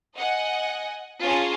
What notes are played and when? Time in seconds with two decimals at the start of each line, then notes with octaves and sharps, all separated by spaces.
0.15 D#5 F#5 G#5
1.22 C#4 F4 G#4 A5 A#5